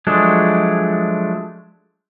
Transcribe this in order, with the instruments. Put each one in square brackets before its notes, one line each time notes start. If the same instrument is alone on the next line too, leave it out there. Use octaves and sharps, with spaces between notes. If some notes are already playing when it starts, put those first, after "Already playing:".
[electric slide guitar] F3 F#3 G#3 A3 D4